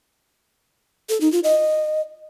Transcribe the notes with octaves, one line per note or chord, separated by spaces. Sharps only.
A4
D#4
F4
D#5